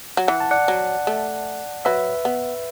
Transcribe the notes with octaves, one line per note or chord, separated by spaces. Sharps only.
F#3
E3 F#5
A5
D5 F#5
F#3
A3
F#3 B4 E5
B3